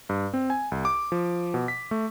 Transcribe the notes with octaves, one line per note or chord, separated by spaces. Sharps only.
G2
C4
G#5
C2
D6
F3
B2
B6
A3